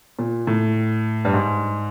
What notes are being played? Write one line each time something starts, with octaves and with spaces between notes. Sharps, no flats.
A#2
A2
G2
G#2